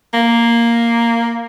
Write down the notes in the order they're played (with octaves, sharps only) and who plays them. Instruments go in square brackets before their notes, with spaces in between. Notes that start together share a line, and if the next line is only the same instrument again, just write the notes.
[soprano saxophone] A#3